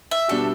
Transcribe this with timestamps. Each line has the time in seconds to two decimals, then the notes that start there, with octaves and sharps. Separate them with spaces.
0.11 E5
0.28 B2 G3 D4 F#4 A4